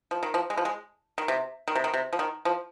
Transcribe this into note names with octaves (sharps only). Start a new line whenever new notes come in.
F3
D#3
F3
G#3
F3
G#3
D#3
C3
D#3
C3
D#3
C3
F3
D#3
F3